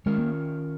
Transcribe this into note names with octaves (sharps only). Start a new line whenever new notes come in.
D#3 G#3 C#4 F4 A#4
A#3